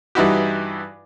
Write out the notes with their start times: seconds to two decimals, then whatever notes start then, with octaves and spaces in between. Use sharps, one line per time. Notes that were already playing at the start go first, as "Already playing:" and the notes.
0.15 G2 E3 D#4 E4 F#4 G4